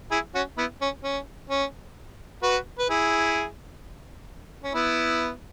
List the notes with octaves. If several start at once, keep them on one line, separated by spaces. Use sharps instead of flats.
E4 G#4
C#4 F#4
B3 E4
C#4
C#4
C#4
F#4 B4
B4
E4 G#4
C#4
B3 E4